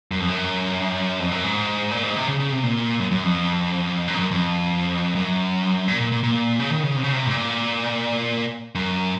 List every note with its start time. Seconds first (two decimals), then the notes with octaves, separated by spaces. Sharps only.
0.11 F#2
0.20 F2
0.29 F#2
1.20 F2
1.31 F#2
1.44 G#2
1.91 A#2
2.03 G#2
2.16 C3
2.28 C#3
2.40 C#3
2.52 C3
2.63 A#2
2.99 F#2
3.11 F#2
3.23 F2
4.08 F#2
4.14 G#2
4.19 F#2
4.31 F2
5.15 F#2
5.88 A#2
6.00 A#2
6.12 A#2
6.23 A#2
6.60 C#3
6.71 D#3
6.83 C#3
6.96 C3
7.04 C#3
7.13 C3
7.26 G#2
7.31 A#2
8.75 F#2